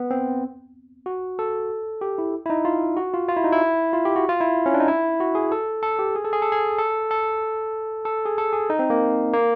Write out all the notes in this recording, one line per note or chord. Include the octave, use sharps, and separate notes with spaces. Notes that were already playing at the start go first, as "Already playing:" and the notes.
Already playing: B3
C4
F#4
A4
G4
E4
E4
D#4
F4
F#4
F4
F4
E4
D#4
E4
F4
G4
F#4
F4
E4
C#4
D4
D#4
E4
F#4
G#4
A4
A4
G4
G#4
A4
G#4
A4
G#4
A4
A4
A4
G#4
A4
G#4
D#4
C4
A#3
A#3